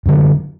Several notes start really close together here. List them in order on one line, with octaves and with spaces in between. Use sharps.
F#2 D3 F#3